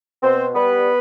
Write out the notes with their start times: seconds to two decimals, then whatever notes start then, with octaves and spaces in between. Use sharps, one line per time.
0.23 B2 C4 C5
0.55 G3 B3 B4